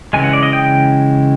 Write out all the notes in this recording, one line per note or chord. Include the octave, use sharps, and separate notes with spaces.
C#3 E3 G#3 G#5
F#5
D5
D#5
G5